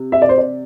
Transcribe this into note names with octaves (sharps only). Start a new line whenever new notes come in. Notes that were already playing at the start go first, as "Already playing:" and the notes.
Already playing: C3
E5
D5
C5
D5